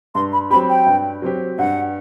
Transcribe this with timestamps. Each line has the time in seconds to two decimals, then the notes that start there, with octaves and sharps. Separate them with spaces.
0.15 G2 C6
0.33 B5
0.50 F#3 C4 G4 B5
0.69 G5
0.86 G2
1.22 F#3 C4 G4
1.58 G2 F#5